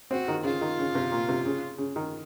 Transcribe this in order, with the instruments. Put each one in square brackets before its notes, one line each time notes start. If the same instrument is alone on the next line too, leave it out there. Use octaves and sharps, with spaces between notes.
[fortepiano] C4 [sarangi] F#4
[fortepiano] D#3
[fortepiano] C#3 [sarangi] F4
[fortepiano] D#3
C#3
C3
A#2
C3
C#3
C#3
D#3